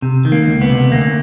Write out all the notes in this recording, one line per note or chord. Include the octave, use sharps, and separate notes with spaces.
C3
D#3
A#3
C#2
B3
C3
D2 A#3